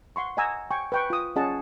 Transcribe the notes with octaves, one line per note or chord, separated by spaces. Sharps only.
F#5 C6 C#6
D#5 F#5 G#5 A#5 E6
G5 G#5 C#6
B4 G5 C#6
F4 D#6
C#4 F4 G#4 D#5 F#5 A5